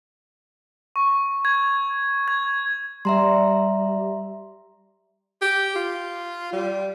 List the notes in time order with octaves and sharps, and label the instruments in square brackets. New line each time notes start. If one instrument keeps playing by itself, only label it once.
[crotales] C#6
G#6
G#6
[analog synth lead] G3 [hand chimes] E5 A#5 C6
[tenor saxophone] G4
F4
G3